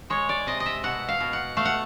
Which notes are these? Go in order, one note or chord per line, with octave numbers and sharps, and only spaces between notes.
G#3 C#5
D5
C3 D#5
D#5
E5
B2 F#5
F5
B2
F#5
A3 F5
F#5